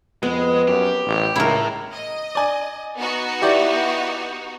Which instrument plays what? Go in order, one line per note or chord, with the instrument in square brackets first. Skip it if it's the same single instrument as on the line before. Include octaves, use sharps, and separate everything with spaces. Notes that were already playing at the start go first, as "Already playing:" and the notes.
[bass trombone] F2 [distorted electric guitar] G#3 [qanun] B3
[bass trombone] F#2 [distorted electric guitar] G4
[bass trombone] A1
[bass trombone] C#2 [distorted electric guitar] A2 [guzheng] E4 A#4
[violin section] D#5
[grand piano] D5 G#5
[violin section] B3 D#4 F#4
[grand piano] E4 G4 D5